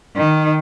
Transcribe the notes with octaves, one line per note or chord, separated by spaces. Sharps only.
D#3